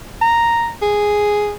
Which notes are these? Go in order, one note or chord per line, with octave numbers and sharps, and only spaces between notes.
A#5
G#4